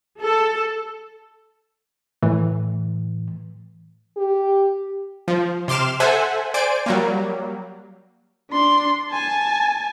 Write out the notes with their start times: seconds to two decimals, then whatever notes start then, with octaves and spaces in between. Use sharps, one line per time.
0.21 A4
2.23 A2 E3
4.17 G4
5.28 F3
5.68 C3 C6 D6 F6 E7
6.00 A4 C5 E5 F#5 G#5
6.54 C5 D5 G#5 D7
6.86 F#3 G3 A#3
8.50 D4 C6
9.11 G#5 A5